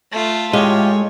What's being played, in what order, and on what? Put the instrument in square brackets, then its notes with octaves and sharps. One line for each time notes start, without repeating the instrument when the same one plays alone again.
[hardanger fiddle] A3 F4
[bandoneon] A2 F4 G4 [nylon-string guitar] G#3 [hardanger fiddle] C#5 [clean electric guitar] D#5 F5